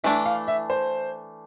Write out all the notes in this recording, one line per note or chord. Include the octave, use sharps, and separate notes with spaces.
E3 A3 D4 E5
F5
E5
C5